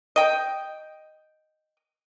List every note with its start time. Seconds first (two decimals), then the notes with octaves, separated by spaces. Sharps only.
0.16 D#5 G5